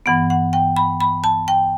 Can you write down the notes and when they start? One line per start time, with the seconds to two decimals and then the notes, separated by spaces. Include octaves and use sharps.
0.06 G2 E3 B3 F#5
0.30 F#5
0.53 G5
0.76 B5
1.01 B5
1.24 A5
1.48 G5